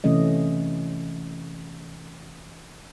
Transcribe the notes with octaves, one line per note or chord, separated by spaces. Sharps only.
C3 E3 A3 C#4 D#5